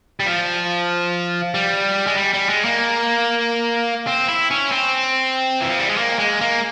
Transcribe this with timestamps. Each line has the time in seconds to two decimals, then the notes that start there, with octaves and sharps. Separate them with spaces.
0.20 G3
0.26 F3
1.54 G3
2.07 G#3
2.17 G3
2.34 G3
2.49 G#3
2.65 A#3
4.07 C4
4.28 E4
4.51 C#4
4.72 C4
5.61 E3
5.70 F3
5.79 G3
5.89 G#3
5.98 A#3
6.19 G#3
6.41 A#3